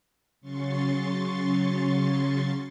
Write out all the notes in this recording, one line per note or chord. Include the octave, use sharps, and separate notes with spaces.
C#3 F#3 C#4 C6 C#6 A6